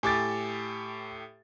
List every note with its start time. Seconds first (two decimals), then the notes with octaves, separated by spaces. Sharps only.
0.03 A2 G4 A4 G#5 D6 A6